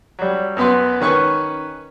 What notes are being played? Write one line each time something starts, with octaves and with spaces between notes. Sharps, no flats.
F#3 G3
F#2 B3 B4 C6
D#3 C#4 B4 C#6